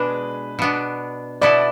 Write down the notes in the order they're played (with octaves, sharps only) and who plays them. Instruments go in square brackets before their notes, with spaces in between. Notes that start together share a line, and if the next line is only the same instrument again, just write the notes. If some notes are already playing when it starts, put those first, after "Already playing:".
Already playing: [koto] B2 G#3 D4 G#4 [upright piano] B4
[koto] B2 B3 D4
[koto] B2 B3 E4 A4 [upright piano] D5